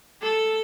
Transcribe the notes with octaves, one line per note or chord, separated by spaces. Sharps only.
A4